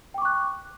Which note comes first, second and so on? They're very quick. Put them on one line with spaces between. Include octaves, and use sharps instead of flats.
G5 D6 C#6 F#6